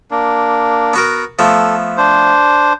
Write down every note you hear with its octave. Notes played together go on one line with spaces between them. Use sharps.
A#3 D4
B3 F#4 A#4
F3 A3 B3 A4
D4 C5